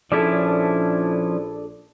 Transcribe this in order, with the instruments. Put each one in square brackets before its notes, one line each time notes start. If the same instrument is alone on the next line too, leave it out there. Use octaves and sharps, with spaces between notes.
[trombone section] A#1 D4 [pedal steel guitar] F3 C#4 E4 [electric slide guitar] A4 D5